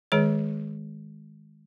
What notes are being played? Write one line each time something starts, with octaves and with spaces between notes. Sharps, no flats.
D#3 G#3 G#4 C#5